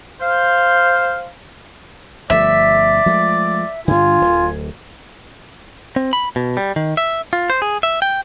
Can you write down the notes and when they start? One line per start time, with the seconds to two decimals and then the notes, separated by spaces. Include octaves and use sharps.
0.21 C5 F5
2.30 G1 F3 A3 D5 E5
3.06 F3 G#3 A3
3.88 G2 D3 F4 G#5
4.21 D1
5.96 C4
6.13 B5
6.36 B2
6.57 G3
6.76 D#3
6.97 E5
7.33 F4
7.50 C5
7.62 G#4
7.83 E5
8.02 G5